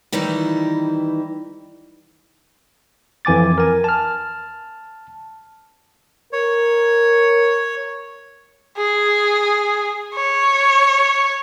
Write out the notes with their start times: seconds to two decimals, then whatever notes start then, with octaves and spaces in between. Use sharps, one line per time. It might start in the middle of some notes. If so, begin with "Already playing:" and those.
0.12 D#3 E3 G3 D#4 E4
3.25 F2 E3 G#5 D6 A6
3.58 A#4 G#5
3.84 A5 F6
6.33 A#4 C#5
8.77 G#4
10.15 C#5